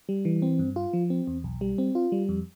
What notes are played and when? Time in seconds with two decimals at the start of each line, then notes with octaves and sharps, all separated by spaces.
0.09 G3
0.25 E3
0.42 C4
0.59 G2
0.76 F4
0.93 F3
1.10 C4
1.27 E2
1.44 B1
1.61 G3
1.78 C4
1.95 F4
2.12 G3
2.29 F2